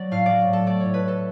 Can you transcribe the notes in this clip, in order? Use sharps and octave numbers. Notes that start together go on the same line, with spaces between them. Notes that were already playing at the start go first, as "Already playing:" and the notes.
Already playing: F#3 D5
A2 F5
F#3 D5
A2
A4
A3 D5
C#5
A2
B4
A2 A4